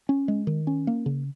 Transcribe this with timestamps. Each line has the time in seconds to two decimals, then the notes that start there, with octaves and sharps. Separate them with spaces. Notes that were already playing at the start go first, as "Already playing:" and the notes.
0.09 C#4
0.28 G#3
0.47 D#3
0.67 C#4
0.87 A#3
1.06 C#3